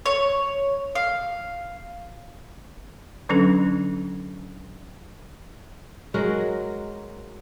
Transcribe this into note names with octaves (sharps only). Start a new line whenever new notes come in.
C#5
F5
D3 F#3 C#4 D4 A4
F#3 G#3 F#4 A#4